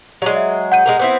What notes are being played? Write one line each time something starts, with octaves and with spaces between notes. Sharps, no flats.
F#3 G#3
E5
F#5 G6 D#7
G#3 A#3 A#4
B3 C4 E4